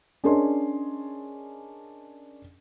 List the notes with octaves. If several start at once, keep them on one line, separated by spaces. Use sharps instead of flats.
C#4 D4 G#4 A#4 D#5 C6